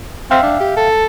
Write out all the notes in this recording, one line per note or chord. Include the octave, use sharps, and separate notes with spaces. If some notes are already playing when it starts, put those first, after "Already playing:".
C4 E5 F5 G5
D4
G4
A4